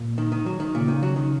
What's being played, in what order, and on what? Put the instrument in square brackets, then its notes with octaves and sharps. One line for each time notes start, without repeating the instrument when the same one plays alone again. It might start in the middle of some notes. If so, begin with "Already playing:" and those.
Already playing: [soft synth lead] A#2
[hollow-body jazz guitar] D#3
D#3
F#3
D#3
[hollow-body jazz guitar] A#2 [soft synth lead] C#3
[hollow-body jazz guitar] D#3
F#3
D#3